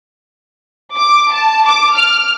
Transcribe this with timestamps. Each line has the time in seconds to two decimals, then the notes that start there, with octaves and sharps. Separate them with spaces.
0.95 D6
1.32 A5
1.66 D6
1.97 F6